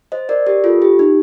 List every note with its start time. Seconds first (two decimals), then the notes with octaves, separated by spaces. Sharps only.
0.12 C5 D#5
0.29 A#4 D5
0.46 G4 A#4
0.64 F4 A4
0.82 G4
0.99 D#4